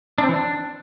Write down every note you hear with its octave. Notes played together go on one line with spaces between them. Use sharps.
D4
C4
E3
D4